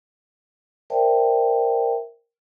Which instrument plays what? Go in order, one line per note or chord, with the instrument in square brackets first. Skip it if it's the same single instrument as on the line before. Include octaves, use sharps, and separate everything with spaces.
[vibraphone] A#4 C5 D5 E5 G5 A5